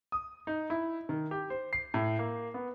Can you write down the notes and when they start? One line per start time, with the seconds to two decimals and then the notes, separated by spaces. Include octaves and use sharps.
0.12 D#6
0.47 D#4
0.70 E4
1.09 D#3
1.31 G4
1.50 C5
1.73 C7
1.94 A2
2.19 A#3
2.54 B3